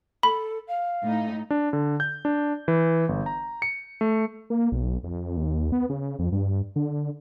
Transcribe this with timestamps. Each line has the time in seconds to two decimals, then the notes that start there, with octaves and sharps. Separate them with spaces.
0.23 A4 B5
0.67 F5
1.04 A2 D#4
1.51 D4
1.73 D3
2.00 G6
2.25 D4
2.68 E3
3.09 G1
3.26 A#5
3.62 C#7
4.01 A3
4.50 A#3
4.72 B1
5.04 F2
5.37 D#2
5.72 B3
5.89 C#3
6.19 F2
6.32 G2
6.76 D3